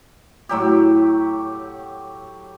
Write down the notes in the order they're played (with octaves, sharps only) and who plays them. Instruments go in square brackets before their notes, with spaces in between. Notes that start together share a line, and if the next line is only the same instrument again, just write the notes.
[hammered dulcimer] A2 F#3 G4